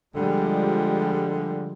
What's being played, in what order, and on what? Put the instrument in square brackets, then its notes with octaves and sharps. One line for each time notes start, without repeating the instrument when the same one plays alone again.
[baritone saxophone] D3 [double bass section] F3 G3 G#3